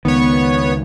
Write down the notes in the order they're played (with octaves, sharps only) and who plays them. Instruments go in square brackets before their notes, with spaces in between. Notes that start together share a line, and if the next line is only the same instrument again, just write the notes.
[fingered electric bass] C#2 D#3 [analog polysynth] B3 C#5